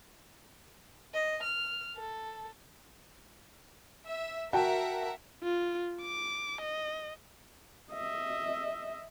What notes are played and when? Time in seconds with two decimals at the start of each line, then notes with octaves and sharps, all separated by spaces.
1.14 D#5
1.43 F6
1.96 A4
4.06 E5
4.53 F#4 A#4 E5 F#5 G5 A5
5.43 F4
6.03 D6
6.62 D#5
7.92 D#5 E5